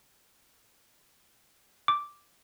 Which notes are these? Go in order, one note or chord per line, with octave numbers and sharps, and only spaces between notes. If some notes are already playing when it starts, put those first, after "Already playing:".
D6